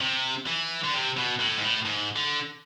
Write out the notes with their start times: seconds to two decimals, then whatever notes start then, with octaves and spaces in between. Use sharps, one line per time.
0.01 C3
0.47 E3
0.84 D3
0.94 C3
1.17 B2
1.39 A2
1.57 G#2
1.63 A2
1.85 G#2
2.16 D3